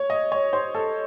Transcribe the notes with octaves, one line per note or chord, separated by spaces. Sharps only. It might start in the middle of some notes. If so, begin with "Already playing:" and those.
Already playing: C#5
D#5
C#5
C5
A4